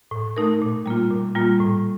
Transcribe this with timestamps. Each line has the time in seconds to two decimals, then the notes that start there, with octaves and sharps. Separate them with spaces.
0.11 A2
0.37 A3 D#4 A#4
0.62 A#2
0.86 G3 A#3 F4
1.11 A#2
1.35 G3 A#3 F4
1.60 A2